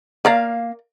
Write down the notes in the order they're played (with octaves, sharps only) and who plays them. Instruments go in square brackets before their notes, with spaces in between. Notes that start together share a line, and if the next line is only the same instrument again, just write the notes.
[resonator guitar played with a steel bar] A#3 F5 [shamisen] A#4 D5 A#5